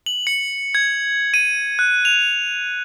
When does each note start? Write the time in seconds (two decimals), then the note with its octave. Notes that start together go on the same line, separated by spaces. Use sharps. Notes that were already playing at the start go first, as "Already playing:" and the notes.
0.06 F#7
0.27 C#7
0.75 G#6
1.34 D#7
1.79 F#6
2.05 F7